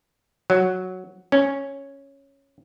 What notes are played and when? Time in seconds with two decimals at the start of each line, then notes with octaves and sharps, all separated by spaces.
0.50 F#3
1.32 C#4